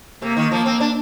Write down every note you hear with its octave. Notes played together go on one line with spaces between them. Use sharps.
C3 A#3
D#3
F3 A#3
C4
D4